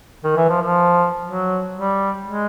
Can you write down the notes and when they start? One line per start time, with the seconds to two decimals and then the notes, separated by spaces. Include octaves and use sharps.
0.24 D#3
0.37 E3
0.49 F3
0.62 F3
1.25 F#3
1.75 G3
2.26 G#3